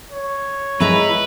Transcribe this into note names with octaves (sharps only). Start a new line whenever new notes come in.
C#5
G#3 E4 B4 A#5